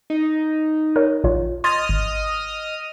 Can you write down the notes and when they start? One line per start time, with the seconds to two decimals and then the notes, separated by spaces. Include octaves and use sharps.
0.10 D#4
0.96 A#4 C#5
1.24 A#1 F4 C#5
1.64 D#5 C6 D#6 F6 G#6 A6
1.89 G#1